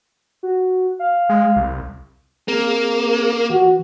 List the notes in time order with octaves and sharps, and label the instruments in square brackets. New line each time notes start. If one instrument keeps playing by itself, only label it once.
[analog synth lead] F#4
F5
[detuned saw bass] G#3
C2
[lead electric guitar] A#3 [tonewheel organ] C4 G#4
[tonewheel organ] E3 [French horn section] F#4